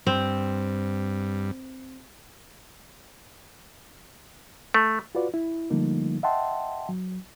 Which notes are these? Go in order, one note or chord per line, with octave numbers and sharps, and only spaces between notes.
G2 C4
A3
F4 F#4 B4 D5
E4
D3 F3 G3 A3 A#3 D#4
D#5 E5 F#5 G5 A5 C6
F#3